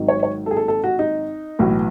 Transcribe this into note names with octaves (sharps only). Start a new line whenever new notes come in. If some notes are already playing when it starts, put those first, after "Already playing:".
Already playing: G#1 G#2 D#3 F#3
C#5
C#5
A4
G#4
A4
A4
F#4
D#4
B1 A2 E3